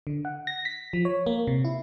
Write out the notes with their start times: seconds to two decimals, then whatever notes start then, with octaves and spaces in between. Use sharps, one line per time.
0.07 D3
0.25 F#5
0.47 A#6
0.65 B6
0.93 F3
1.05 C#5
1.26 A#3
1.47 C3
1.65 E4